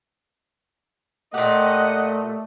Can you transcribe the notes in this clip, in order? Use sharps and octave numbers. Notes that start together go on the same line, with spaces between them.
A#2 A3 G4 D#5 F#5